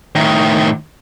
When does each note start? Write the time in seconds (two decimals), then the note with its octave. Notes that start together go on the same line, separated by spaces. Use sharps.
0.15 A2 D#3